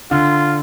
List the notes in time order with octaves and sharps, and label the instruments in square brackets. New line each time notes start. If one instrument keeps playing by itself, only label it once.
[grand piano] D3 [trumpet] F4